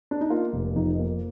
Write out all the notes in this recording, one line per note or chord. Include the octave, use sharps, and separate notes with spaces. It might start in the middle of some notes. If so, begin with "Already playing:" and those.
D4
D#4
A#3 F4
F1
F2 D#4
A#3